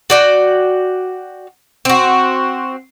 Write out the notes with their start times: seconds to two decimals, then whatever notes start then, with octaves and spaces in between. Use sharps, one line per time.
0.10 F#4 D5 G5
1.85 C4 F#4